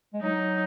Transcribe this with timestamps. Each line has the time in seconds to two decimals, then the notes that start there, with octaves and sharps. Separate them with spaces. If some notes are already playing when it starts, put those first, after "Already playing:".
0.14 G#3
0.22 F#3 D#4